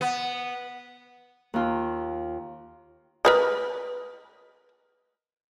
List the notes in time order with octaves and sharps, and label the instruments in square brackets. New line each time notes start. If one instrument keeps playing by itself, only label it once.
[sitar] B3
[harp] D#2 F4
[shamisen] A#4 B4 D#5